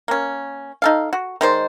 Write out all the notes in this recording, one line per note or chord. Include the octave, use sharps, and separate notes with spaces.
A#3 C#4
D#4 A4 F5
F#4
D#3 G#3 C5 D5